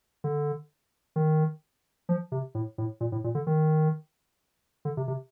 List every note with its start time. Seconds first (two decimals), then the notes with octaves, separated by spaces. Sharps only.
0.24 D3
1.16 D#3
2.09 F3
2.32 C3
2.55 A2
2.78 A2
3.01 A#2
3.12 A2
3.24 A#2
3.35 D3
3.47 D#3
4.85 D3
4.97 C3
5.08 C3